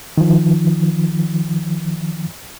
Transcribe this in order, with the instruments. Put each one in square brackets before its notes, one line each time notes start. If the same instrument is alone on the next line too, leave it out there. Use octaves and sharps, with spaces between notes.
[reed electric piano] D#3 F3